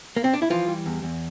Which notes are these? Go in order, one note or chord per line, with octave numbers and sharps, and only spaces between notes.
A#3
C4
D4
E4
E3 F3 F4
G3
E2
E2